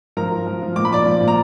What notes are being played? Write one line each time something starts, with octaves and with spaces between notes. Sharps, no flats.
F3 A#4 A#5
F3
F3
F3
A#2 D6
B5
F3 D5 D6
F3
A#2
A#5